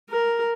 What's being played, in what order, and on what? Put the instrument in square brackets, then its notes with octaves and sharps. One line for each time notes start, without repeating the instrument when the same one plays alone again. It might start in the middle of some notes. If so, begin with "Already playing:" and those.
[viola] A#4